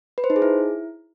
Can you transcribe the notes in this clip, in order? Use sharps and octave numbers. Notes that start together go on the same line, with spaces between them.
B4
C5
D#4
G#4
E4